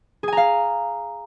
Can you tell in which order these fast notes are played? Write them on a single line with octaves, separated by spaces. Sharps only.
G#4 G#5 A#5 F5